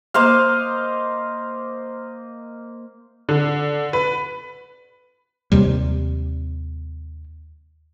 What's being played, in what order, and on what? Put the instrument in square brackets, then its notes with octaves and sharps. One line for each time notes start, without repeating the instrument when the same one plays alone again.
[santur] A#3 C5 D#5 F5
[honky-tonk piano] D3
B4
[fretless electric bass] D#2 C3 G3